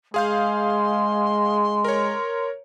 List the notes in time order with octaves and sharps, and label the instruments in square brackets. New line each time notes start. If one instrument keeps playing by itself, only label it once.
[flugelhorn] G#3 [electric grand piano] G#4 F5 G6 [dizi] C6
[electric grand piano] A#4 C#5